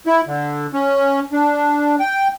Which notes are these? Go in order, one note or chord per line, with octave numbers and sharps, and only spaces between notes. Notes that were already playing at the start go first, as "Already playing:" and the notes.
E4
D3
C#4
D4
G5